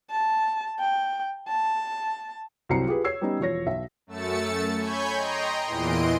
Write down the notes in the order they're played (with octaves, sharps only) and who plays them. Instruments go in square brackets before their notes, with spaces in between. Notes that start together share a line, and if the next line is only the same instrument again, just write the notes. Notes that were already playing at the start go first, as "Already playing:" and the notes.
[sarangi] A5
G5
A5
[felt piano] C2 F#3 C4 A#5 C7 C#7
F4 G4 G#4 B4
C#5 E6 G#6 C7
G3 B3 C#4 D#4
E1 F3 C#5 A#6
B1 E5
[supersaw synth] F#2 A3 E6 A6 C#7
C#5 G#5 B5 C#6 G6
D#5 G5 A#5 C6
E2 A#2 E3 D#5 C6 D7